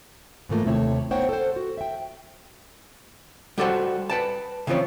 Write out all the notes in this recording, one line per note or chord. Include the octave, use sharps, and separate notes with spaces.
G#2 E3 F3 A3 A#3 F4
D#2 C3 A3 E4 G#4 C#5
B3 D#4 C5 C#5 F#5 G5
A4 C5
F#4
E5 G5
G3 F#4 G4 A4 C5 F#5
B4 G5 A5
C#3 E3 F3 C4 C#5